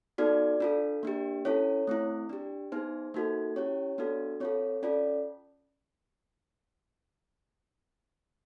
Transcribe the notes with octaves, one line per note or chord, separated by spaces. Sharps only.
B3 D#4 F#4 A4 D5
D4 F4 A4
A#3 D4 G4
C#4 E4 A4 C#5
A3 C4 E4
D4 G4
B3 D#4 G#4 C5
A#3 D#4 F#4 A4
C#4 E4 G4 C#5
B3 D4 F#4 A4
C4 F4 A4 C#5
C#4 F4 A4 D5